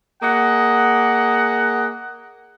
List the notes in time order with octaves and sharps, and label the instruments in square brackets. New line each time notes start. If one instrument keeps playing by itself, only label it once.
[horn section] A#3 G#4 D#5 F#5